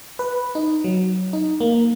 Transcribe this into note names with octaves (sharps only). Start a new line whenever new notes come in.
B4
D#4
F#3
D#4
A#3